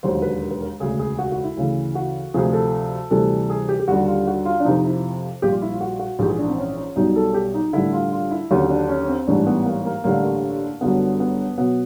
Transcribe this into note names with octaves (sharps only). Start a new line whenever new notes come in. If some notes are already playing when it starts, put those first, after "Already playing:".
E1 D#2 D3 F#3 C5
B4
A#4
B4
A#4
E1 D2 C#3 G#4
G#4
F#4
F#4
E4
D2 C#3 E3
F#4
D2 C3 F3 G#4
A4
D2 C3 E3 G3 A4
G#4
G4
G4
D#2 D3 G3 F#4
F4
F#4
F4
D4
F2 C3 F3 D#4
E4
A#1 A#2 G3 G4
F4
E4
F4
F#4
F#4
A#1 G#2 E3 G4
G#4
D4
C4
C#4
C#4
B1 B2 G3 D#4
A4
G4
D#4
A1 G2 D3 E4
F4
F4
E4
D#2 D3 F#3 C#4
D4
C#4
C4
A1 G#2 E3 G3 D4
B3
A#3
A#3
A1 G2 D3 G3 A#3
A#3
G1 F#2 D3 F#3 B3
B3
B2 F#3 B3